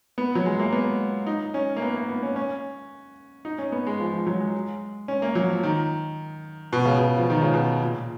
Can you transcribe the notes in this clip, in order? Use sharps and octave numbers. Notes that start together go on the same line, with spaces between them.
B3
F#3
G#3
A#3
B3
D#4
C#4
A#3
B3
A#3
B3
C#4
C#4
D#4
C#4
B3
G#3
F3
F3
F#3
G#3
C#4
A#3
F#3
F3
D#3
B2
C#3
B2
F3
D#3
C#3
B2
A#2